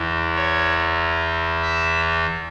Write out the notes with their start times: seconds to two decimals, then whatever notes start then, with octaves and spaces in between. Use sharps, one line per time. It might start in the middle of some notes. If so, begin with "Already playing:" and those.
Already playing: E2 E3
0.36 C#5
1.63 E5